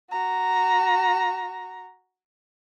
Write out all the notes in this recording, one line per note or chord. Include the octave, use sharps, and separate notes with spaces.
F#4 A#5